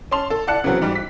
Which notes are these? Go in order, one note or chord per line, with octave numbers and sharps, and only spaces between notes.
C#4 A5 C6 F7
A4
D5 F#5 A5 F#6 C#7
C#3 E3 F#3 B3 C4
G#2 G3
B6